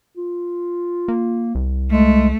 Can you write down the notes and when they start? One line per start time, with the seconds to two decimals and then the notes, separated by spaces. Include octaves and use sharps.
0.17 F4
1.08 A#3
1.55 C2
1.91 G#3 A3